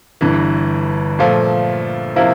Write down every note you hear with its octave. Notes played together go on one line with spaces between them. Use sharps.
G1 G2 E3
A#2 F3 A3
C3 F3 A#3 E4